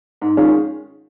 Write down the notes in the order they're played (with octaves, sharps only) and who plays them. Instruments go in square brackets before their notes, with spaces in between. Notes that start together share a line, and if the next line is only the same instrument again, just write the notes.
[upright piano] G#2
D#3 G#3 C#4 F4